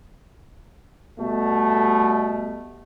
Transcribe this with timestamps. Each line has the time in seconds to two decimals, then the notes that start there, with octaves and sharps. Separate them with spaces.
1.18 B2 G3 A3